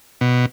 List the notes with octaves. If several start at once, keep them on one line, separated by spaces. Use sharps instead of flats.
B2